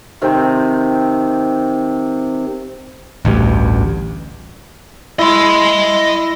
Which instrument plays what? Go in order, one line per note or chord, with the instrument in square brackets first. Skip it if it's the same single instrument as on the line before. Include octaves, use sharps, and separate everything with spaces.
[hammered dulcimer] C3 D#3 C4
[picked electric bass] A1 D2 G2
[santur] E4 [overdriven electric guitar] D#5 C6